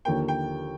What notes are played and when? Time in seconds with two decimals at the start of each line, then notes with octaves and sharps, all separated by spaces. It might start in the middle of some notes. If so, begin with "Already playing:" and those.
0.05 D#2 D3 F3 A#3 G5
0.28 G5